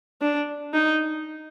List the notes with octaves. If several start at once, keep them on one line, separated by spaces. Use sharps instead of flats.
D4
D#4